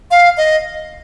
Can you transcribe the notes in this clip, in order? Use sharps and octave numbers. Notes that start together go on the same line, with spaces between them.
F5
D#5